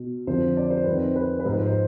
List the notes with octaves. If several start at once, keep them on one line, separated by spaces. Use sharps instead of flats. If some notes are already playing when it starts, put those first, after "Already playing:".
Already playing: B2
F2 D3 F3 C5
D5
C5
F2 D#3 B4
C5
B4
B4
G#2 F3 C5
C5
C5